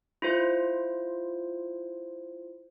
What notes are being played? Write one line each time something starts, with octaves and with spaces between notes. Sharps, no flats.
E4 F4 C5